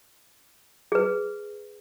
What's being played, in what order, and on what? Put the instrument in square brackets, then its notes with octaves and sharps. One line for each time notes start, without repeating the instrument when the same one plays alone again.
[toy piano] G#4 B4